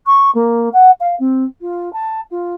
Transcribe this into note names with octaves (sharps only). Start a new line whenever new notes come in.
C#6
A#3
F#5
F5
C4
F4
A5
F4